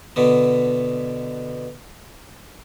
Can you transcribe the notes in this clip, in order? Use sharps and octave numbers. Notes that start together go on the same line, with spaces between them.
B2 D3 B3